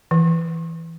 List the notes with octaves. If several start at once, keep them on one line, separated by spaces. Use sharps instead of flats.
E3